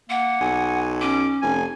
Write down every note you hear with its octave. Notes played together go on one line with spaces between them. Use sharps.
A#3 F#5
B1 G#5
C#4 D6
F1 G#5